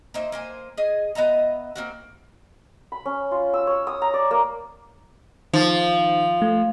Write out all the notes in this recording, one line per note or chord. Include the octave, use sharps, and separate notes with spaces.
A#3 D#4 C5 E5
A#3 C5 G#5
G#4 D#5
B3 D#5 E5 A#5
A#3 C4 F#4
B5
C#4
F4
E6
C#5
D#6
A#5
D5
A#3
D#3 F3
A3